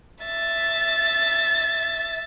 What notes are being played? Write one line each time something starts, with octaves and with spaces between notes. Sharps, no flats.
E5 A6